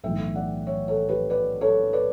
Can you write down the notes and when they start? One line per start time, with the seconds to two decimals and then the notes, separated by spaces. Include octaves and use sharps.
0.03 B1 A2 E3 E5 G5
0.35 D5 F#5
0.67 C#5 E5
0.88 A4 C#5
1.09 G4 B4
1.30 B4 D5
1.61 A4 C#5
1.93 B4 D5